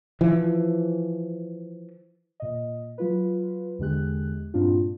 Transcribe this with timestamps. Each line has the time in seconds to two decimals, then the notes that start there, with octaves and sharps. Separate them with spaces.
0.21 E3 F3
2.40 A#2 D#5
2.98 F#3 F4 B4
3.79 E2 D3 G#3 G4 F#6
4.54 G2 A#2 C4 D4 F4